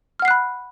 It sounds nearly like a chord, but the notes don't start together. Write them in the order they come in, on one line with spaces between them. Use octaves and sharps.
F6 F#5 C7 F#6 B5